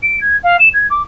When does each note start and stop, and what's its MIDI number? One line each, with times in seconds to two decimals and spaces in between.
0.02 0.19 98
0.20 0.37 92
0.43 0.56 77
0.59 0.68 100
0.73 0.86 92
0.90 1.02 86